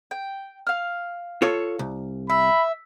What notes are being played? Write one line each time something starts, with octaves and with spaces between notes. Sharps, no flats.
G5
F5 F6
F4 A4 C#5
C2
E5 B5